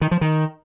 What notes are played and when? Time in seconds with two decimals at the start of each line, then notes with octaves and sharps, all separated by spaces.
0.01 D#3
0.11 F3
0.21 D#3